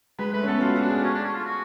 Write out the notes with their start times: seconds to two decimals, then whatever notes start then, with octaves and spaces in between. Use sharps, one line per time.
0.19 G#3 B4
0.33 A3 B4
0.43 C#4
0.47 B3 A4
0.61 F4 F#4
0.76 F#4
0.82 D4
0.90 G#4
1.03 C#4
1.14 D4
1.24 C#4
1.35 F4
1.46 F#4